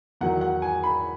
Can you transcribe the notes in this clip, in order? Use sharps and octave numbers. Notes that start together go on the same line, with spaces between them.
E2 D#3 F#3 F#5
F#5
G#5
B5